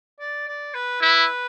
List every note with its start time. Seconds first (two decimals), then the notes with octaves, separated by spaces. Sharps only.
0.20 D5
0.47 D5
0.74 B4
1.01 E4 B4